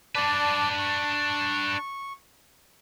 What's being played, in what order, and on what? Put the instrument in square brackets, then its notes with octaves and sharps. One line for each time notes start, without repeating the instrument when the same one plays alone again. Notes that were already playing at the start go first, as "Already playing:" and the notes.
[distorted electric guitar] D4 B4 [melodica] D5 A5
[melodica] C#6